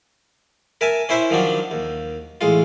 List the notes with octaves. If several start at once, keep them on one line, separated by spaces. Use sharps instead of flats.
A#4 E5 G#5 A5
C#4 E4 C5 E5
D#3 F3 F#3 D4
D#2
A1 G#3 F4